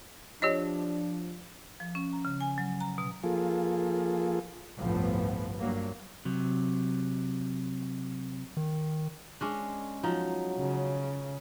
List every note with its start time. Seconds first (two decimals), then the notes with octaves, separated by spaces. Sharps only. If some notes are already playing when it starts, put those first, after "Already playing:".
0.42 F3 D4 G4 C#5 D#5
1.80 F3
1.95 C#4
2.13 A#5
2.25 C#3
2.40 G#5
2.58 F#3
2.80 A#5
2.98 B2
3.23 F3 A#3 F4 G#4 A4
4.77 G1 C2 A2 F3 B3
5.58 G2 F#3 A#3
6.25 C3 F#3
8.57 D#3
9.41 G#3 C#4 D4
10.03 F3 F#3 D#4
10.58 C#3